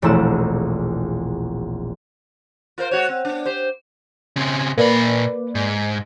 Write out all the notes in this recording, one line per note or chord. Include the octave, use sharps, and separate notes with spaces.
E1 A#1 A3 C4 E4 E7
F4 A#4 C5
G#3 F#4 C#5
C4
B3 D4
G4 C5
C#3 C4
A#2 A#3 B4 D5 B5
G#2